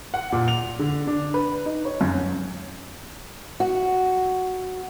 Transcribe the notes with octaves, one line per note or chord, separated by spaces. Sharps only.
F#5
A#2
F7
D3
D4
B4
D#4
C#5
F#2
F#4